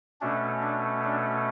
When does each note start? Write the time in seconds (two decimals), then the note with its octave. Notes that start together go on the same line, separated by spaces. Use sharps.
0.21 B2 A3 C#4 D4
0.62 D4
1.04 D4